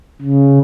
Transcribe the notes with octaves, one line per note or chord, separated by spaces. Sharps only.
C#3